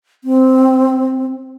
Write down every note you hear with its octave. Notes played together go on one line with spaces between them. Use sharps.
C4